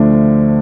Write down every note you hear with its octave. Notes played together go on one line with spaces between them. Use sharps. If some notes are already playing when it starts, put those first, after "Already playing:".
Already playing: D2 D3 F3 A3 D4